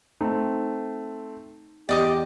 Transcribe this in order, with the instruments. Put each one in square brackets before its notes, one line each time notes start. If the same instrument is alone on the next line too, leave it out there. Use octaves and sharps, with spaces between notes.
[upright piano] A3 C4 [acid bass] D#4
[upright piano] E2 [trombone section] G4 [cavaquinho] D5 D#5 D6